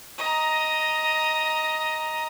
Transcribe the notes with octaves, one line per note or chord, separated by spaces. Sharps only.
D#5 A#5